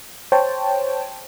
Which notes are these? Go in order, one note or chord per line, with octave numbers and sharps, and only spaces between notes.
C5 C#5 G5 A5